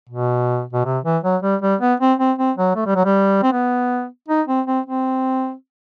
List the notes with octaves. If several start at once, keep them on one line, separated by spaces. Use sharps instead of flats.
B2
B2
C3
E3
F#3
G3
G3
B3
C4
C4
C4
F#3
A3
G3
F#3
G3
C4
B3
D#4
C4
C4
C4